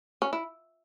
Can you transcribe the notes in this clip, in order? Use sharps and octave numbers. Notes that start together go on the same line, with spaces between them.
C#4
E4